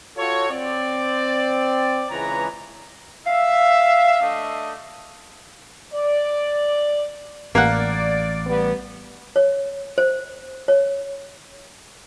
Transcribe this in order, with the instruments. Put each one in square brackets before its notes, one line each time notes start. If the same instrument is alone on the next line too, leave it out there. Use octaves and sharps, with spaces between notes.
[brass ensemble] F4 F#4 A4 C#5
C4 D5
C#2 E3 G#3 B4 C#5 A#5
[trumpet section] E5 [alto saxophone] F5
[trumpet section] A3 D4 D#5
[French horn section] D5
[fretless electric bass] A1 [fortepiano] A#3 F#5 [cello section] D5
[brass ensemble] G3 B3
[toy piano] C#5
C5
C#5